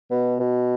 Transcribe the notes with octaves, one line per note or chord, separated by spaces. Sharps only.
B2
B2